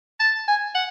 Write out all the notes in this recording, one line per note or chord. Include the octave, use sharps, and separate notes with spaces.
A5
G#5
F#5